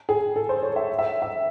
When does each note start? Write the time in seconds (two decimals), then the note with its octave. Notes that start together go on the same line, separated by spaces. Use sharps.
0.09 G#4
0.36 A4
0.49 C5
0.62 C#5
0.76 E5
0.99 E5
1.22 E5